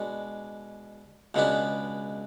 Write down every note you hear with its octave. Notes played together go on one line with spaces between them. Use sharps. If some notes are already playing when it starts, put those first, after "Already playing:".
Already playing: B2 G#3 D4
C#2 B2 G#3 B3 D4